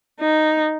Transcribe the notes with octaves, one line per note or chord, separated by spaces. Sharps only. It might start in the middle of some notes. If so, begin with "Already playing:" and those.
D#4